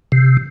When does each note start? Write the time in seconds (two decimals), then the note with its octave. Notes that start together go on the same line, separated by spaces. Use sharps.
0.12 C3